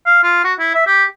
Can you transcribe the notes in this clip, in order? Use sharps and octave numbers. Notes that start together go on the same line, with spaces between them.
F5
F4
F#4
E4
E5
G4